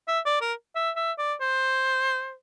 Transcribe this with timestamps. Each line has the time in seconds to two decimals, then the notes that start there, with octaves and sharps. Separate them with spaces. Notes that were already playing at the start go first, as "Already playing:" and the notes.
0.08 E5
0.26 D5
0.41 A#4
0.75 E5
0.96 E5
1.18 D5
1.41 C5